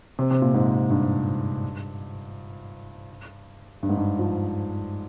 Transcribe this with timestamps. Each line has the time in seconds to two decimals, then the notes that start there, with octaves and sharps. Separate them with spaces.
0.19 C3
0.31 C3
0.42 A#2
0.54 G#2
0.90 G2
3.83 G2
3.89 G#2
3.97 G2
4.19 F3